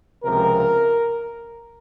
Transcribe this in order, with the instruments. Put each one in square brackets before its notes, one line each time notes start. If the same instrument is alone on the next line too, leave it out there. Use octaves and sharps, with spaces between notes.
[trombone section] C#2 C3 F3 A#4